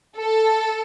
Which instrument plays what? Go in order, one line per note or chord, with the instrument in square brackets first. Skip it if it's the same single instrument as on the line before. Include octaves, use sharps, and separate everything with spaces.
[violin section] A4